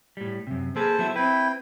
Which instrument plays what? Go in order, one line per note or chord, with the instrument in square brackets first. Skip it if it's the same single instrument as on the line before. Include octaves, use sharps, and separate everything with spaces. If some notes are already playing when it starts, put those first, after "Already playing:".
[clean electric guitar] A2 G3
F#2 C3
[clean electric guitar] A#3 G#4 B4 [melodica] A4 C5
[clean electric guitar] F#3 B3 E4
[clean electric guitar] C4 B4 [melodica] E4 G5